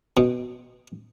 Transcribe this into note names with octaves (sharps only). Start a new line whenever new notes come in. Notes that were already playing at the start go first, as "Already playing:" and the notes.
B2